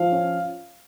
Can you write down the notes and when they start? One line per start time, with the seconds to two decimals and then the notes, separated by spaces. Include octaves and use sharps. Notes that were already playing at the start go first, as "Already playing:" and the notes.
Already playing: F3 F5
0.12 C#4